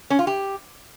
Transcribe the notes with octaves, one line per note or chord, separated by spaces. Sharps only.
C#4
F4
G4